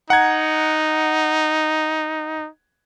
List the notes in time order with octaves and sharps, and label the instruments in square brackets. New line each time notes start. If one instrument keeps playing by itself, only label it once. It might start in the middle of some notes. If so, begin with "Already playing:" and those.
[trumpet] D#4 [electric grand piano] F#5 A#5 G#6